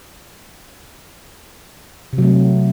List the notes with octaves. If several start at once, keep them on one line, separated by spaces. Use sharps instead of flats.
C3
F#3
A3